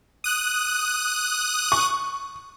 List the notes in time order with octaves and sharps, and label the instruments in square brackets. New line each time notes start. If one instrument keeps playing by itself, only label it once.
[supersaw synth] D#6 F#6
[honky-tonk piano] C#6